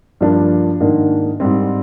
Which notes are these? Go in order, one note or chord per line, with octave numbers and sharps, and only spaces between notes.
G2 F3 A#3 D4
G#2 D#3 A#3 D4
G#2 G3 C4